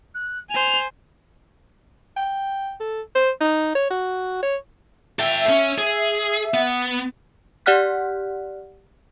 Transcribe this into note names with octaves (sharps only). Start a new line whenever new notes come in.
F#6
C5 G#5 F7
G5
A4
C5
D#4
C#5
F#4
C#5
A4 E5 G5
C#4
G#4
B3
G4 D5 F#5 F6 F#6 B6